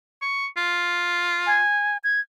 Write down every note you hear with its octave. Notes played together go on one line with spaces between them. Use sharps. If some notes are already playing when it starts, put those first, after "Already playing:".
C#6
F4
G#5
G#6